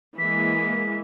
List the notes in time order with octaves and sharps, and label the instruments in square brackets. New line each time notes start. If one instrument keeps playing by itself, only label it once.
[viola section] E3 G#3 A#3 [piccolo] B6